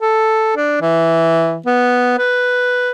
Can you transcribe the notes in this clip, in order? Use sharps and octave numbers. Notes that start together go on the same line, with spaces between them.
A4
D4
E3
B3
B4